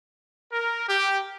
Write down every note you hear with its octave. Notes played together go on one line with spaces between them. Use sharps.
A#4
G4